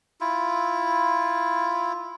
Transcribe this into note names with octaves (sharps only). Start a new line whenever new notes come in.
E4 F4